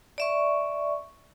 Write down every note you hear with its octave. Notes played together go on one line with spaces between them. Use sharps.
D5 E5 C#6